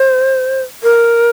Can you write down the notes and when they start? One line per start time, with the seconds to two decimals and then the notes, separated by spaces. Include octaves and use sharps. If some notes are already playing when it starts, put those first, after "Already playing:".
Already playing: C5
0.83 A#4